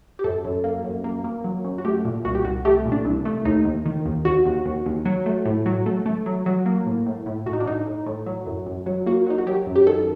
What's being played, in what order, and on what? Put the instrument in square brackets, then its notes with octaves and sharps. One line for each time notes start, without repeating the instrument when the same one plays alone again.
[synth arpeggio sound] G4
F#2 A4
F#2
A#3
F#2
A#3
A#3
F#3
F#2
F#4
A3 G4
A#2
C2 F#4
G4
C2 F#4
A3 G4
A#2
D4
C2
A3
D#2 D#4
D#2
D#3
D#2
D#2 F#4
D#2
D#2
D#2
F#3
A3
A2
F#3
A3
A3
F#3
F#3
A#3
A2
A2
A2
A2 F#4
D#4
D4
A2 D#4
A2
A2
F#3
F#2
F#2
F#3
A#3 F#4
F#3 D#4
F#4
F#3 G4
F#2
G4
D#3 A4